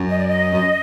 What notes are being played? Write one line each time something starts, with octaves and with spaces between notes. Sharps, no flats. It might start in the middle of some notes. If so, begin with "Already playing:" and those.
Already playing: F#2
D#5
D5
D#5
F#2